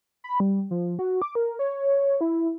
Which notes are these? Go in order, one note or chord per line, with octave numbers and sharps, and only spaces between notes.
B5
G3
F3
F#4
D6
A#4
C#5
E4